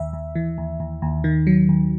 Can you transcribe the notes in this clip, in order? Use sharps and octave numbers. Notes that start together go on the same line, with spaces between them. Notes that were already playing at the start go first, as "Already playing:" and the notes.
Already playing: D#2 E5
D#2
E3
D#2
D#2
D#2
D#3
F#3
D#2